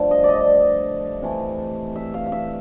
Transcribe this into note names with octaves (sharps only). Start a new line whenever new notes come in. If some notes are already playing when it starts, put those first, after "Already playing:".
Already playing: G2 D3 F3 A3
D#5
D5 D#5
C3 E3 A3
E5
F5
F5
E5